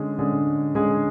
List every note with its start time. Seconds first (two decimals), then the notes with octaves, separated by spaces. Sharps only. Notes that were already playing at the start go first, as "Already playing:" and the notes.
Already playing: D3 G#3 C#4 G#4
0.19 D3 G#3 C#4 G#4
0.75 D3 G#3 C#4 G#4